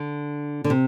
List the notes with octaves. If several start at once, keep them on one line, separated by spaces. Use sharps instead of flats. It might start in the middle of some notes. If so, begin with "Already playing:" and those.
Already playing: D3
D3
C3